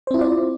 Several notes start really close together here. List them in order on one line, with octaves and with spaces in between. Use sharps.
C5 C4 E4 F4 D5